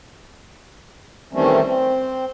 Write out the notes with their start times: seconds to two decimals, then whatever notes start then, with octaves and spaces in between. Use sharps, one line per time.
1.33 D#3 E3 G3 A3 C4 C#4
1.64 C4